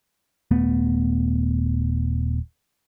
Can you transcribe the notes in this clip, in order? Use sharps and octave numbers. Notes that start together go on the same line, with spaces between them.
D#1 A3 B3